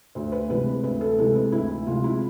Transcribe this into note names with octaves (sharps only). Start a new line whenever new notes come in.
D2 C5
B4
C3 E3 G#3 B4
D2 B4
A4
C3 E3 G#3 A4
B4
D2 E4
C3 F3 G#3 F4
E4